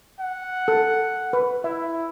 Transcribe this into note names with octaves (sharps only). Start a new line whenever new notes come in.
F#5
A4
B4
E4 E5